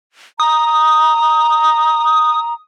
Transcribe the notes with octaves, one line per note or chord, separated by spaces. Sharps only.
A#5 D#6